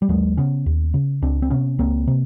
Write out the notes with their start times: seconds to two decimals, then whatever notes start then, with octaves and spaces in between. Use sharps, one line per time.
0.02 G3
0.09 D#2 F#3 G#3
0.37 C#3 B3 C#4
0.66 D#2
0.94 C#3
1.22 C#2 C4 D4
1.42 C4
1.50 C3 B3 C#4
1.79 C#2 A#3 C4
2.07 C3